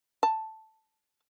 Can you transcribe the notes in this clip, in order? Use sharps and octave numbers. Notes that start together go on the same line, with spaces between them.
A5